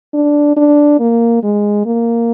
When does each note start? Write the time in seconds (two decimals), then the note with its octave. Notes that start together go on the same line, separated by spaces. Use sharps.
0.14 D4
0.56 D4
1.00 A#3
1.43 G#3
1.86 A#3